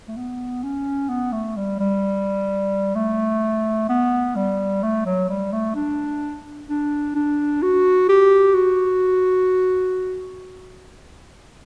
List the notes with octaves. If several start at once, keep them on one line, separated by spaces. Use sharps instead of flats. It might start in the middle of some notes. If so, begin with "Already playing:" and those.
A3
B3
C#4
B3
A3
G3
G3
A3
B3
G3
A3
F#3
G3
A3
D4
D4
D4
F#4
G4
F#4